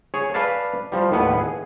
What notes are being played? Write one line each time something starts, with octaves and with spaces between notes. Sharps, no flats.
G#4 C#5
B4 D5 F5 A5
F3 G3
D#2 A2 B3 B4 F#5
G#4